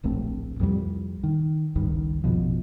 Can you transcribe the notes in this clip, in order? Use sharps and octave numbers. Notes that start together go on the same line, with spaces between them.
D1 A#1 A3 C4
C2 F2 F3 G3
D#3
G#1 C#2 G2 D#3
A1 F2 B2 F3